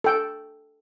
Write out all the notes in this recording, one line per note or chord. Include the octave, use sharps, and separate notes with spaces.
A4 G5